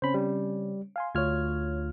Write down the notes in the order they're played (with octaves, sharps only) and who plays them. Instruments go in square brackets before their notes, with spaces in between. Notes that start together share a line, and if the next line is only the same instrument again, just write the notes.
[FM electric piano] C#3 C4 C#4 [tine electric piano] C5 B5
[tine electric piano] G3
[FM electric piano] F5 G#5 C6
[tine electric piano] D2 F4 F6 [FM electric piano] C#5 G#6